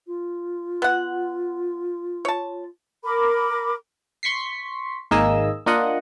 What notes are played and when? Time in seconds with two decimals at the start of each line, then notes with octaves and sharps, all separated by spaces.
0.07 F4
0.82 B3 F#5
2.25 C#5 A5
3.04 A#4 B5 D6
4.23 C6 C#6 B6 C7
5.11 G#1 A#3 D#4 G#4 D#5 E6
5.66 A#3 D4 F4 D#5 F#5